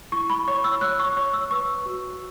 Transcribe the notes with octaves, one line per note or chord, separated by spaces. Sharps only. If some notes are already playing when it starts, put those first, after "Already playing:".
E4 C#6
B5
C#5 C#6
E6
C#5 F#6
C#6
C#5 C#6
E6
B4 C#6
F#4